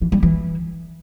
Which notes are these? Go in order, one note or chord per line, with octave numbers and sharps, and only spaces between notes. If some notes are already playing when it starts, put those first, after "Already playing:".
E3
G3
E3